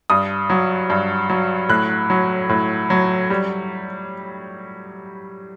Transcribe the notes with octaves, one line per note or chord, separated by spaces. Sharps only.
G2 D#6
F#3
G2
F#3
A2 F#6
F#3
A2
F#3
G3